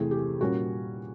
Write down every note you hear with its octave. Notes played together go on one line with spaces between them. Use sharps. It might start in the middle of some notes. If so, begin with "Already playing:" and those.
Already playing: E2 C3 E3 A3 C4 G#4
G4
A#2 G3 A#3 C#4 F#4